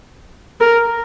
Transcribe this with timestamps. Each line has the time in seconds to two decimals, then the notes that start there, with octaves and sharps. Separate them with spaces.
0.61 A#4